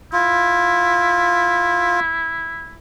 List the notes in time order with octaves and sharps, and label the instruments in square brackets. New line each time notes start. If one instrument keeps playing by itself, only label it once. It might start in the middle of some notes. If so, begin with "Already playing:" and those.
[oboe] E4 [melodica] F4